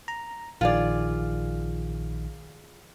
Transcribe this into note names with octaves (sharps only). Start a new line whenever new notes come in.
A#5
A#1 D#3 F4 G#4 D5